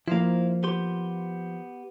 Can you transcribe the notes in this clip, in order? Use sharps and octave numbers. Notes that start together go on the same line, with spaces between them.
F3 A#3 E4 C5 F5
B3 G4 C6